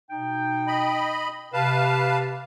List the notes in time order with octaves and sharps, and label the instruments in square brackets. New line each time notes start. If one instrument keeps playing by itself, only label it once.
[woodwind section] B2 D#4 G5
[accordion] D#5 B5
[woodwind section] C3 [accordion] B4 F5 A5